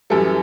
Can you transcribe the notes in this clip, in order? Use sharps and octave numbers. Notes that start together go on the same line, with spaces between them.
F#2 E3 G3 A4